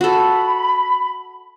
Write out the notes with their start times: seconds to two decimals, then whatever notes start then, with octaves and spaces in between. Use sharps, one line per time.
0.01 F#4 A4 B5